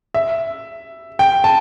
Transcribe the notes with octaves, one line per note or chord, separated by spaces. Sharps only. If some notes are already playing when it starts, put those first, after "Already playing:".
E5
G5
A5